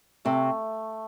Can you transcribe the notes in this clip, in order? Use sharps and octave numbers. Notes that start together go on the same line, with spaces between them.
C3 A3